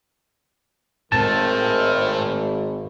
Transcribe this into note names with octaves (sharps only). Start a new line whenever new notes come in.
G#1 A2 A3 A#4 C5 A5